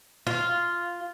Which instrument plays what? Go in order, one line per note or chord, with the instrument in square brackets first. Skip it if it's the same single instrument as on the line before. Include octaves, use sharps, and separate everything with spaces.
[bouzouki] F4